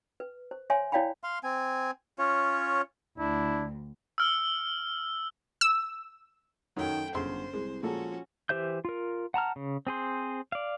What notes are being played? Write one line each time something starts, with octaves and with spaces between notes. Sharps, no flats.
B4
C5
C#5 E5 G#5 C6
E4 C#5 D5 F5 G5 B5
F5 C6
C4 G#5
C#4 F4 C#5
D2 D4 E4
E6 F6
E6
F#2 D#3 F#3 A3 G5
G1 F#2 C#3 C5 C6
C2 G#3
A#2 F3 G#3 C#4 F#4 A4
E3 G4 C5 E5 G6
F4 A#4
F#5 A5 A#5 F6
C#3
C4 G#4 C5
D5 F5